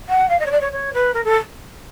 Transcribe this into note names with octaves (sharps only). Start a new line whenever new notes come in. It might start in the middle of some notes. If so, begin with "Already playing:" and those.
F#5
F5
D#5
C#5
D5
C#5
C#5
B4
A#4
A4